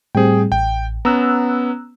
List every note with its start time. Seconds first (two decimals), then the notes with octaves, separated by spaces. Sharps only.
0.15 A2 G3 C4 G#4 G5
0.52 A1 G5
1.05 B3 C#4 A#5 E6 F#6